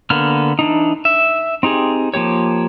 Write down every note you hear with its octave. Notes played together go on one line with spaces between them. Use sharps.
D3 A#3 B3 F6
E3 D4 D#4
E5
C4 D#4 G4 G#4
F3 A#3 G4 C#5